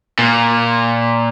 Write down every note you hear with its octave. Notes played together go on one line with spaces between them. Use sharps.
A#2